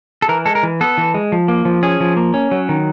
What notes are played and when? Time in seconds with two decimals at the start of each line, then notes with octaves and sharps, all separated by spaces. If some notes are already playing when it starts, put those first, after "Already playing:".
0.22 A4
0.29 E3 A#4
0.45 G#3 A4
0.55 A#4
0.63 E3
0.81 B3 A4
0.98 E3
1.14 G#3
1.32 F3
1.48 A#3
1.65 F3
1.83 C#4 G#4
2.01 F3
2.17 A#3
2.34 C#4
2.51 F#3
2.69 D#3